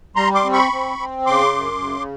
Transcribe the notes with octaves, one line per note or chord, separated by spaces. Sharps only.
G3 A#5 C6
C6 D6
C4
B5 C#6
C4
C4
C#3 C6 D6
F#2
C#3